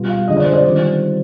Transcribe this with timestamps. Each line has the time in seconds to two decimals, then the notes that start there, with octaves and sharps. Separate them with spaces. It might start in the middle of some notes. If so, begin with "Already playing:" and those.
Already playing: B2 G3 B3 F4
0.09 F5
0.28 D3 G#3 D4 F4 D#5
0.37 D5
0.44 C5
0.53 D5
0.64 D#3 G3 C4 F4